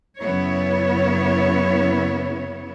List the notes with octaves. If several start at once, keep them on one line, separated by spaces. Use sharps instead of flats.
F#2 C#3 B3 E4 C#5